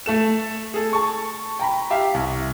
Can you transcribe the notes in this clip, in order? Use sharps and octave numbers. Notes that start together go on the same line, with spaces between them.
A3 A4 E7
G#4 A4
A5 C#6
G5 A#5 B5
G4 E5 F5
C2